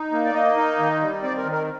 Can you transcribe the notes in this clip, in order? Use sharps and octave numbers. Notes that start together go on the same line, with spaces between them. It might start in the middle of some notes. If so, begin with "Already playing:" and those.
Already playing: D#4
A#3
D5
A#3 D#5
D#4
D#3
G3
C4 D5
A#4
D#3
A#4